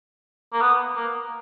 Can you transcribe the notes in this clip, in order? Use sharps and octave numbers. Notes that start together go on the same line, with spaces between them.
A#3
B3
A#3